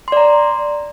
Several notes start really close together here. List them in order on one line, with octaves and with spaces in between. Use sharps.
C6 D5 A#5